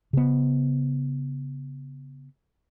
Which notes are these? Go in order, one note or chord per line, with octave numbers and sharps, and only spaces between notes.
C#3 B3